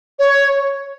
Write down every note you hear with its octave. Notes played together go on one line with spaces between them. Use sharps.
C#5